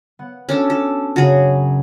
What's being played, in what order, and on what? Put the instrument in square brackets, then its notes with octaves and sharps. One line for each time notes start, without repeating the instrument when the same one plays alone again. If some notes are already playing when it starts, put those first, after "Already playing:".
[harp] B3 F#5
[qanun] C#4 D4 A4 [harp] F#4
[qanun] A4
[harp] F#2 C#3 [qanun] F#4 G#4